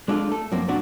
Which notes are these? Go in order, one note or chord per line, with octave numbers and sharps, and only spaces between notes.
G#3 D4 E4 F4 A4
A3 A4
F#2 F3 A#3 C4
A#2 F#3 D4 F#4